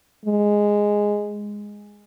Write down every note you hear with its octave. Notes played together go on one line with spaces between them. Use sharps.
G#3